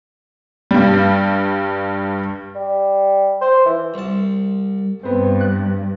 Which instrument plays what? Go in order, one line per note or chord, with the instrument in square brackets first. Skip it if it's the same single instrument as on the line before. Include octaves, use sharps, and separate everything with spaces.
[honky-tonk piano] G2 G3
[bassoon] G3
C5
E3
[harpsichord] C2 A5
[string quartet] G2 [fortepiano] B3 C4
[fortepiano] F#6